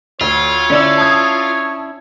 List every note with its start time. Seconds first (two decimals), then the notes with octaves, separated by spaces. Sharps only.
0.21 D2 F4 C#5
0.70 D3 C#4 D4 E4 D5 E6
0.98 A5 D#6 G#6